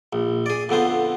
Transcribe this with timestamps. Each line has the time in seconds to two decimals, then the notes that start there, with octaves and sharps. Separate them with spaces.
0.13 A#1
0.46 G#4 D5
0.69 F2 D3 B3 C5